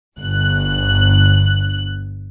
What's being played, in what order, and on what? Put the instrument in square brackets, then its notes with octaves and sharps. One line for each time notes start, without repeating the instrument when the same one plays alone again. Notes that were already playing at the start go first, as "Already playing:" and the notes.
[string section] G1 F#6